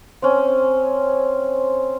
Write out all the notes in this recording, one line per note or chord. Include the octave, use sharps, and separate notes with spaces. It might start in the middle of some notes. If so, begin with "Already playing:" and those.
C4 C#4